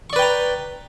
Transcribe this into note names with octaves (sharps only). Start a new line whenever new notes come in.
B4 D5 G5 A#5 C#6